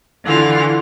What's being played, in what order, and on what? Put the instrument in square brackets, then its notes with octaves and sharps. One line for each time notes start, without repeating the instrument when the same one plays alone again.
[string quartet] D3 E3 F4